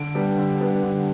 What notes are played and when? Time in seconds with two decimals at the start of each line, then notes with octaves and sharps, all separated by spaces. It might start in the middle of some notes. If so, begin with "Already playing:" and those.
Already playing: D3 D7
0.15 G3 B3 D4
0.38 D3
0.60 G3 B3 D4
0.83 D3